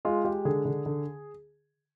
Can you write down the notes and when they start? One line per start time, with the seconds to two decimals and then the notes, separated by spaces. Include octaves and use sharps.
0.05 G#3 F4
0.25 G#3 G4
0.45 D3 G#4
0.65 D3
0.86 D3